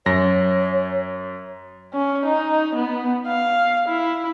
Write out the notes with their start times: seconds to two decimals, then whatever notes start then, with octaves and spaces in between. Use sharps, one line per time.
0.06 F#2 C#5 A#6
1.94 C#4
2.26 D#4
2.76 B3
3.27 F5
3.89 E4